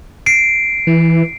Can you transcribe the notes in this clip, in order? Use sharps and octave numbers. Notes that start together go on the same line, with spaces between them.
C7 D7
E3